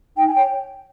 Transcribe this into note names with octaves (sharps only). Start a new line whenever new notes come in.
D#4 G5
G#5
C#5 G5